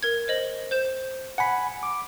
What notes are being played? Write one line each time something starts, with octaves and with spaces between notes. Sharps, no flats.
A#4 G#6
C5 D#5 F#7
C5 G6 E7
F#5 G#5 B5 B6 C#7
D6